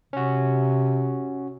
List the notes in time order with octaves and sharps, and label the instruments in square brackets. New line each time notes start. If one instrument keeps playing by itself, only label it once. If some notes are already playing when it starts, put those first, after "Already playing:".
[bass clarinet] C3 [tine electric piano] C#4 F#4